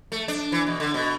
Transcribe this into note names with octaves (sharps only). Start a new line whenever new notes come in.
A3
D4
E3
B2
D3
B2